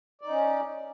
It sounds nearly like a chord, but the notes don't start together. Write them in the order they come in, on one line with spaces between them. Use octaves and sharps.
D5 D#4 C#4